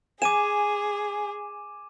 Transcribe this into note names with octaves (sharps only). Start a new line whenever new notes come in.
G#4 G#5 D6 D#7 E7